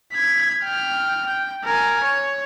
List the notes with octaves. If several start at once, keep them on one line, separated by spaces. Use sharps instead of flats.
G#6 B6
G5 F6
G5
A#4 G#5
C#5